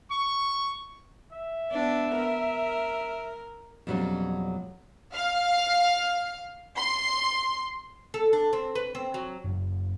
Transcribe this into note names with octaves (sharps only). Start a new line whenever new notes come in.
C#6
E5
B3 D4
A#4
F2 B2 F#3 G3 C#4
F5
C6
A4
D4
C4
B4
C4
F#3
F#1